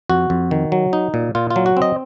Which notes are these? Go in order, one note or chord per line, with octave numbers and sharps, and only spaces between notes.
F2 F#4
F2
D#3
F#3
D#4
A#2
A#2 F4
F4
F#3
F#4
C4
D#5